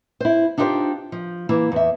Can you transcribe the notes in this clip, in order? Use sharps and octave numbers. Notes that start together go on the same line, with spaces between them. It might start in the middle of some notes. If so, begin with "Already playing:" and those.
E4 C5
D4 D#4 F4 G4 B4 C5
F3
E3 A#3 E4
E2 E5